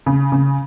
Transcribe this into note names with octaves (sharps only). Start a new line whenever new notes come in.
C#3
C#3